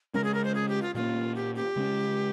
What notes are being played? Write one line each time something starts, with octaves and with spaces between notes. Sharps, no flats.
C#3 G#3 C#4 A#4
G#4
A#4
C5
G#4
G4
F4
A#2 G3 A#3 C#4 F4
G4
G4
C#3 G#3 C#4